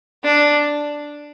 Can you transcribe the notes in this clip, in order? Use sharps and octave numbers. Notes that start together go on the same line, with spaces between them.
D4